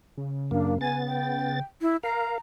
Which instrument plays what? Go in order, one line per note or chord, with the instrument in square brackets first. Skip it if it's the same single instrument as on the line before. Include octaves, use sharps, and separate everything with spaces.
[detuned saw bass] C#3
[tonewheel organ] F#2 A#3 [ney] D4
[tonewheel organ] B3 A6 [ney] G#5
[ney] G5
E4
[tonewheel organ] A#4 F5 [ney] A#5